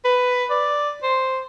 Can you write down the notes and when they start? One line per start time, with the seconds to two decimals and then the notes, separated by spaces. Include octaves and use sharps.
0.05 B4
0.51 D5
1.03 C5